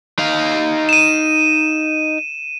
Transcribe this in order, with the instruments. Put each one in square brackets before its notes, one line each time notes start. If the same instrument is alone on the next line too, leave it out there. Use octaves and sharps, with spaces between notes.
[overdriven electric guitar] D#4 F5
[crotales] D#7 E7